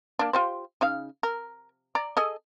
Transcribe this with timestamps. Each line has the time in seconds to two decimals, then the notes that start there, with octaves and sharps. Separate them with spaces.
0.19 A#3 D4
0.33 F4 G4 C5
0.81 C#3 D#4 F5
1.23 A#4
1.95 D5 A#5
2.17 G#4 A4 D#5